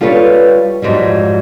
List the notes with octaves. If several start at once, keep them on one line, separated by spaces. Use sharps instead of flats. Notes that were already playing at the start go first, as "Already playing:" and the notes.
G3 F4 A4 B4 C#5
F2 G#2 F#3 G3